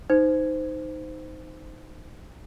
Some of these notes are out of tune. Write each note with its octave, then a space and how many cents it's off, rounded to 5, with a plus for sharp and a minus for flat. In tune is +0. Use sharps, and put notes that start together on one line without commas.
D#4 +0 C5 -20